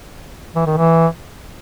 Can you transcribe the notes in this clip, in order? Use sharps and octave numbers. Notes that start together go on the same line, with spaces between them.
E3
D#3
E3